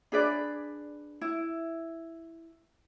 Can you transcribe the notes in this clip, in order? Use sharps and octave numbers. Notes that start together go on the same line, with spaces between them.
D4 G#4 B4 D5
E4